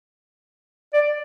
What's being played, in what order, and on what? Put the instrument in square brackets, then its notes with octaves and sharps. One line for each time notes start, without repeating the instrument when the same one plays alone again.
[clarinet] D5